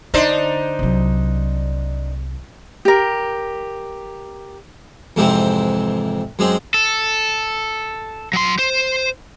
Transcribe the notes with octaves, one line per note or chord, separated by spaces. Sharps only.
D3 D4 D#4 C5
C2 F#3
G4 A#4
F2 G#2 C3 E3 C4
F#2 G#3 C4 G#4
A4
F#3 C6
C5